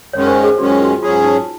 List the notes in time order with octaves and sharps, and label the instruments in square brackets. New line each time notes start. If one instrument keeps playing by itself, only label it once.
[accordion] F#2 D#3 G#3 C#4 [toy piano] C#5
[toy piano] C5
G#4
[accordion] F#2 D#3 G#3 C#4 [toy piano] F#4
[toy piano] F4
F#4
[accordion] G#2 F#3 C#4 G#4 [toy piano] F4
[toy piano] D#4